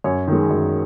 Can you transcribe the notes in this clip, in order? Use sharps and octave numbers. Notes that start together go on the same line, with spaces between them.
F#2 C#5
D#3 G#3
F#2